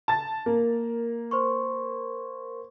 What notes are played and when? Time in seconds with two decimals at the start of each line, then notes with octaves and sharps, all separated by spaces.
0.08 A5 A6
0.46 A#3 A#4
1.31 C5 C6 C#6